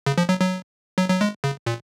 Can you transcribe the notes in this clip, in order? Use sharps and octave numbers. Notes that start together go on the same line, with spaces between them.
C#3
F3
F#3
F#3
F#3
F#3
G#3
C#3
A#2